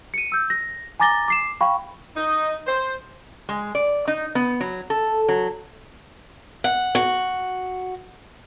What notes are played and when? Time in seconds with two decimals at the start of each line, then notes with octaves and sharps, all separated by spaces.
0.14 C#7 D#7
0.32 E6 G6
0.50 A#6
1.00 G#5 A#5 D6 A6 A#6 G7
1.28 D6 C7 E7
1.61 F5 G5 B5 C#6
2.16 D#4
2.67 C5
3.49 G#3
3.75 D5
4.07 D#4
4.35 B3
4.61 F#3
4.90 A4
5.29 F#3
6.64 F#5
6.95 F#4